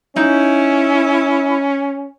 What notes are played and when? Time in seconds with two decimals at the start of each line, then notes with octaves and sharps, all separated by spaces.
0.16 C#4 D#4 E4